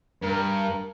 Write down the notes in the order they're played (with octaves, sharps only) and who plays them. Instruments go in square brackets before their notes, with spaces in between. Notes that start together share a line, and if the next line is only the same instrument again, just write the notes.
[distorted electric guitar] G2 [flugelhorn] A#4